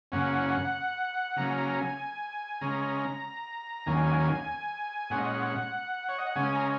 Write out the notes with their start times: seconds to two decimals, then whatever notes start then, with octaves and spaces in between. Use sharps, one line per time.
0.12 F#2 C#3 A#3 C#4 F#5
1.36 C#3 F#3 A#3 C#4 A#5
1.58 A#5
1.78 G#5
2.61 C#3 G#3 C#4 A#5
3.86 D#2 D#3 F#3 A#3 C#4 G#5
5.10 A#2 G#3 C#4 F#5
5.18 D#5
5.25 F#5
6.09 C#5
6.18 D#5
6.27 F#5
6.36 C#3 G#3 C#4 G#5
6.55 A#5